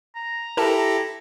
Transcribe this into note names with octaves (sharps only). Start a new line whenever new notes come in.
A#5
E4 G4 A4 A#4 A5